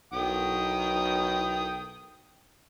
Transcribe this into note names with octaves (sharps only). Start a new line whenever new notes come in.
B1 G5 D#6